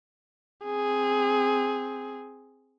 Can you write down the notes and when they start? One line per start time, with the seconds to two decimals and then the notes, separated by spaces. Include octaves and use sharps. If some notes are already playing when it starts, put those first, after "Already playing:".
0.65 C4 G#4